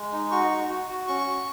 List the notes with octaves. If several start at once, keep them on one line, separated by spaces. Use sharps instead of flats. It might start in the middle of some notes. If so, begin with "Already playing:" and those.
Already playing: G#3
D#4
F#4 C#6
F#4
F#4
F#4
C#4 C#6
F#4